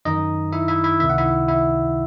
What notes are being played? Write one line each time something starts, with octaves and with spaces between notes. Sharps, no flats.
F#2 D#3 D#4 D#5
E4 E5
E4 E5
E4 E5
C#2 C3 D#3 E5
F#5
E4 E5
E4 E5